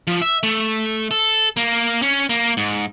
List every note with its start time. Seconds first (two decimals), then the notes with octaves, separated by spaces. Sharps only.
0.07 F3
0.22 E5
0.43 A3
1.11 A4
1.57 A#3
2.02 C#4
2.29 A#3
2.57 G#2